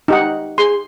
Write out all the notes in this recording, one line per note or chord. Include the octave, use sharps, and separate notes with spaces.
D#4 G4 F#5
G#4 C6